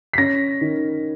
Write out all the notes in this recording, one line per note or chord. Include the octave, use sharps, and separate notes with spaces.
B6
C#4 A#6
D#3